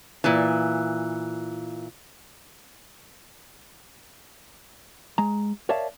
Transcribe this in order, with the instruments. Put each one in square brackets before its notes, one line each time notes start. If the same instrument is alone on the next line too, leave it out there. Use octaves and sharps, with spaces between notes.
[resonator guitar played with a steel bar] A#2 E3
[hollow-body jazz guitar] G#3 A#5
A#4 C#5 D5 E5 F5 A5